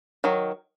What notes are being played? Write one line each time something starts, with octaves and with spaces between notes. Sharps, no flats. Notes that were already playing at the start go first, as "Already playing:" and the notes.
D#3 F#3